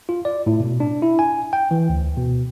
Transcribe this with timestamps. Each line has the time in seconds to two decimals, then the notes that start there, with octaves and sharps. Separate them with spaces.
0.09 F4
0.25 D5
0.46 A2
0.60 B2
0.80 D4
1.02 E4
1.19 G#5
1.53 G5
1.71 E3
1.89 D2
2.17 B2